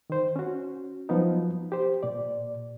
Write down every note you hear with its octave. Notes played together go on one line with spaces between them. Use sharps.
D#3 C5
C#4 F#4
F3 F#3 B3 D#4
G4 C5
A#2 D5